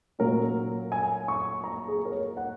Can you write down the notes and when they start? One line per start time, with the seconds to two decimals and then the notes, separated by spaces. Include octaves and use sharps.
0.19 A#2 F#3 C#4 A#4
0.92 G#5
1.28 C#6
1.64 A#5
1.88 G#4
2.05 A#4
2.12 C#5
2.37 F#5